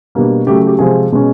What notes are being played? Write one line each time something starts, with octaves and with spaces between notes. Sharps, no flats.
B2 G3 A#3 D4
C#3 F#3 A3 G4
G4
C3 F3 G#3 G#4
B2 G#3 C#4